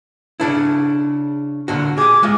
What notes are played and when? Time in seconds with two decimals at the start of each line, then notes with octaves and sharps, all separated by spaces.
0.40 C#3 D4 E4
1.68 A#2 D3 F#4
1.98 G#4 D6
2.23 G#3 F4 E5